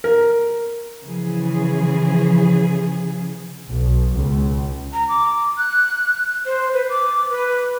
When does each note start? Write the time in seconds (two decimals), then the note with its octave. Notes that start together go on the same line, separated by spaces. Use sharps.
0.04 A#4
1.03 C#3 E3 F3 G#4
3.68 B1
4.15 C#2
4.93 A#5
5.09 D6
5.58 F#6
6.46 C5
6.74 B4
6.90 D6
7.30 B4